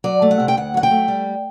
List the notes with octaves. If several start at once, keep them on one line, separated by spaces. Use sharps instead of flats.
F#3 D5
A3
F#5
C3
G5
D2 F#5
F#3 F#5
G5
A3
G3